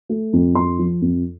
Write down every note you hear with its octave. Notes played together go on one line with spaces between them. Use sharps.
A3
F2
F2 C6
F3
F2